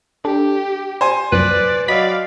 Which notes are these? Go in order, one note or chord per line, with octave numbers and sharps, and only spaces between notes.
D4 G4 A4
C5 G#5
C2 F#2 A#2 B4 D5
F#3 D5 D#5 F5 B5 B6